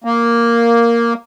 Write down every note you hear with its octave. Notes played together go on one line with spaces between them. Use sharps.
A#3